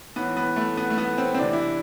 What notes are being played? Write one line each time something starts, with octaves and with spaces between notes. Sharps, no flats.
A2 E3 B3
B3
A3
B3
A3
B3
C4
C4
C3 E3 D4
E4